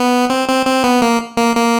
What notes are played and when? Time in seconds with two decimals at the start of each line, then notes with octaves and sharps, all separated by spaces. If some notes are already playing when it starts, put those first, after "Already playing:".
Already playing: B3
0.30 C4
0.48 C4
0.66 C4
0.84 B3
1.02 A#3
1.37 A#3
1.56 A#3